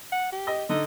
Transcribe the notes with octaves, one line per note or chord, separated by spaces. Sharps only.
F#5
G4
D#5
D3 D#4